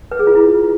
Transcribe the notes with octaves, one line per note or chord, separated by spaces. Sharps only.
B4
G#4
F4
E4